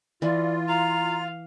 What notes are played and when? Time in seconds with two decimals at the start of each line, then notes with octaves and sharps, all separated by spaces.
0.22 E3 F4 D5
0.68 F5 A#5